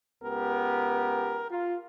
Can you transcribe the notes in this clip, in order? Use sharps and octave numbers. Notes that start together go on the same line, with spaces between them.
C#2 B3 G4 A#4
F4